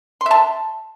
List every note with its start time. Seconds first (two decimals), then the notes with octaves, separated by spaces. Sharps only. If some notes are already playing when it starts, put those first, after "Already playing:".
0.21 C6
0.26 E5
0.31 A5